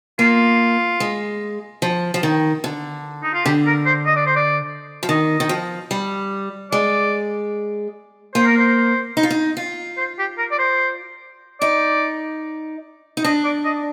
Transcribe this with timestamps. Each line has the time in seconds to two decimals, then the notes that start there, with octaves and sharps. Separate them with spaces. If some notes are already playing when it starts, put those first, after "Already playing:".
0.19 A#3 F4
1.00 G#3
1.82 F3
2.14 F3
2.23 D#3
2.64 D3
3.23 D#4
3.34 F4
3.45 D3 G4
3.67 A#4
3.86 C5
4.06 D#5
4.16 D5
4.26 C5
4.36 D5
5.03 F3
5.09 D#3 D#5
5.40 D#3
5.49 F3
5.91 G3
6.72 G#3 D5
8.35 A#3 C5
8.46 A#4
8.58 C5
9.17 D#4
9.23 F4
9.30 D#4
9.57 F4
9.97 C5
10.19 G4
10.38 A#4
10.51 D5
10.59 C5
11.61 D#4 D5
13.17 D#4
13.24 D4 D#5
13.45 D5
13.65 D#5